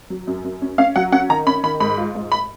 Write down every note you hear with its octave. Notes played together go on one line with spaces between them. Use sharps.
F#3
F#2
F#2
C#4
C#4 F5
F#3 F#5
C#4 F#5
D#3 A#5
C#4 B5
D#3 B5
G#2 B5
F4
G#2
B5